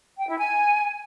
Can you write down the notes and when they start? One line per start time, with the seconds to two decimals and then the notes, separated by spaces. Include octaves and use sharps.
0.18 G5
0.28 E4
0.38 G#5